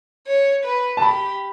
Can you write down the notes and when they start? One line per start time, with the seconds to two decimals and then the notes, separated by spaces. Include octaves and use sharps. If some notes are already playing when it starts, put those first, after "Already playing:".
0.27 C#5
0.65 B4
0.97 A5
1.02 G4 B5